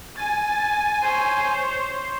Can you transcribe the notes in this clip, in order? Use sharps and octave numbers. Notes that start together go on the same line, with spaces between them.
G#5 A6
C5 C#5